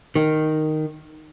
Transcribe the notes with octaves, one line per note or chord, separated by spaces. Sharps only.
D#3